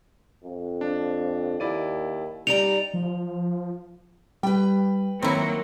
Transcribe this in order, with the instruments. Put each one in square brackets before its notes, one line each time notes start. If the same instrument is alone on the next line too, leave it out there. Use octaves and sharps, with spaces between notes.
[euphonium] F2
[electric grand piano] D4
[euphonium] D#2 [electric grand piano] E4 D5 D#7
[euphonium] G3 [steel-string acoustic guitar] D#4 D5 A#5 [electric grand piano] C#7 D7 [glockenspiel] F7
[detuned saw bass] F3
[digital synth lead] G3 [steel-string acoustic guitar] B4 G5
[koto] D#3 E4 [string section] F#3 A#3 [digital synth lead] C4